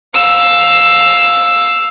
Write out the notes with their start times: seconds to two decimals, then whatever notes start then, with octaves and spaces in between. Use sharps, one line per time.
0.14 F5 E6